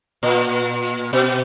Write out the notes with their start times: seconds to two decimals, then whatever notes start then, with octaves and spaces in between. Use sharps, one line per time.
0.23 A#2
1.13 B2